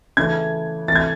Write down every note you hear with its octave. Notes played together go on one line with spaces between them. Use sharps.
C#3 E3 A3 G#6
C3 E3 A3 A6
G#6